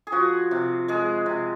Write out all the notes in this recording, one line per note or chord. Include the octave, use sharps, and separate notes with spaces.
G#4
F3 F#4
C3
G#3 G#4
C3